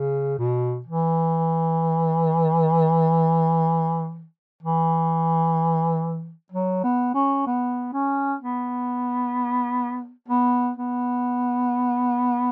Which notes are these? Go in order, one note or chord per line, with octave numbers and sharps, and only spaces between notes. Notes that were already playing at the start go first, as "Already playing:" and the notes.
Already playing: C#3
B2
E3
E3
F#3
B3
C#4
B3
C#4
B3
B3
B3